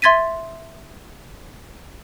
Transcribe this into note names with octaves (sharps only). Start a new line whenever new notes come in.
E5 C6 G#6 A6 B6 D#7